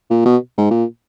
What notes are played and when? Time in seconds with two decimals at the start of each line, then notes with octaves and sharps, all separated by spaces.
0.11 A#2
0.26 B2
0.58 G#2
0.71 A#2